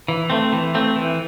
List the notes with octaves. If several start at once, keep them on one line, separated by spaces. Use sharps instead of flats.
E3
A3 C4
E3
A3 C4
E3